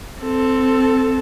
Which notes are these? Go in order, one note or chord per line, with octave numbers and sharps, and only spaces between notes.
C4 A4